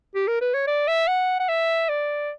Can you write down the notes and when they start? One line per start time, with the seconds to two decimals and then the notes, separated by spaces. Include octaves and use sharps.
0.15 G4
0.28 A#4
0.41 B4
0.54 C#5
0.67 D5
0.88 E5
1.08 F#5
1.40 F#5
1.49 E5
1.89 D5